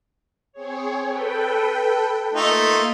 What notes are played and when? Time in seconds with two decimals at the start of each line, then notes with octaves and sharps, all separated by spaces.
0.52 C4 G#4 C#5
1.06 A4 B4 G5
2.34 A3 A#3 D#4 F4